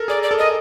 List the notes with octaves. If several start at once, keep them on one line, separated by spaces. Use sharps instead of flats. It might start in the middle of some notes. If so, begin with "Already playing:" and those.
Already playing: A4 A#4
G#4 D5
D5
A4
A#4 D#5